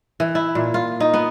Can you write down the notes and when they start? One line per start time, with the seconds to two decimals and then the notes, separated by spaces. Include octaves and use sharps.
0.20 E3
0.35 E4
0.55 A#2
0.74 F4
1.00 D#4
1.14 B3